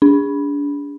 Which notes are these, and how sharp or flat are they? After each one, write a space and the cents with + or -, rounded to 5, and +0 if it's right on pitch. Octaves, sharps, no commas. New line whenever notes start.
D4 -30